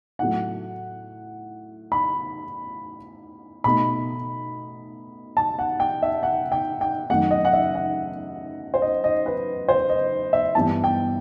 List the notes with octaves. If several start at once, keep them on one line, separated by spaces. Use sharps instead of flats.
A2 F#3 A3 F#5
B5
B2 A3 D#4 B5
A5
F#5
G5
E5
F#5
G5
G5
F#2 D#3 A3 D#4 F#5
D#5
F#5
E5
F#5
C5
D#5
D#5
B4
C5
D#5
E5
G2 E3 G3 B3 A5
G5